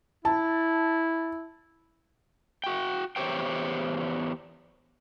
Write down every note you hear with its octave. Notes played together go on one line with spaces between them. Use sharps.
E4 A5
F#4 G5
E2 G4 C5 C#5 G5